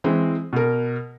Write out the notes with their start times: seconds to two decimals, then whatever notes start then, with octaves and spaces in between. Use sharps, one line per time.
0.04 E3 G#3 C4
0.53 B2 A#4